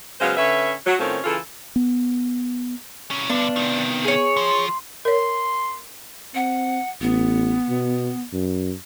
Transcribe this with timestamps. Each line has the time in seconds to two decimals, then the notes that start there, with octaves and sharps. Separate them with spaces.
0.20 C#3 F#3 G#3 B3 C5 F5
0.37 D3 C#4 B4 C#5 E5
0.86 F#3
0.99 A2 D#3 C4 C#4 F4 A4
1.24 C#3 E3 F4 A4
1.76 B3
3.11 C2 C#4
3.30 G2 D3 B3 D4
3.56 C3 D#3
4.04 G#4 C#5
4.37 F3 C6
5.05 A#4 C#5 C6
6.35 C4 F#5
7.01 A1 B3
7.69 B2
8.33 F#2